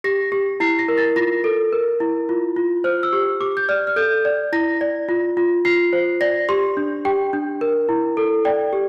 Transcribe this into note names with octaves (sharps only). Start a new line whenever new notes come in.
G4 A#6
G4
E4 C7
A#6
A#4
A6
F4 A#6
A4
A#4
E4
F4
F4
C5 F6
E6
G4
G4 D6
G6
D5 F6
F6
A4 G6
D5
E4 A#6
D5
F4
F4
F4 C7
C5
D5 A#6
G4 C6
D4
G4 G5
D4
A#4
E4
A4
D5 G5
G4